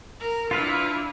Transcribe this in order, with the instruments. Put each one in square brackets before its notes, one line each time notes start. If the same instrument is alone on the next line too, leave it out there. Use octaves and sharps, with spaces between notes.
[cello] A#4
[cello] D4 E4 [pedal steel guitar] F4 B4 F5